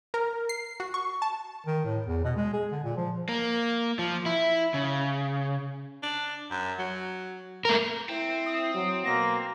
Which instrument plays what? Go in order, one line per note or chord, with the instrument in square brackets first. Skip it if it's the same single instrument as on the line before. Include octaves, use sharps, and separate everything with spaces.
[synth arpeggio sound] A#4
C7
F#4
C#6
A5
[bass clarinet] D#3
A2
E2
B2
G#3
G#4
D3
A#2
F3
[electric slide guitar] A#3
F3
E4
C#3
[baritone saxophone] D4
F#2
F#3
[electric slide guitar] A3 A#4
[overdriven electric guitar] C4 [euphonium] E4
[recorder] D#6
[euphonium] F#3
[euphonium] B2 [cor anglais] A#3 [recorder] A#6